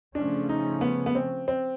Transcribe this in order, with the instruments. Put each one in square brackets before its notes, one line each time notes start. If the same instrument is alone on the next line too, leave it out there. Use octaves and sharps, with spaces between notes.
[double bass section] C#3 F3 A3 C#4 [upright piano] D4
[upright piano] D#4
B3
B3
C4
C4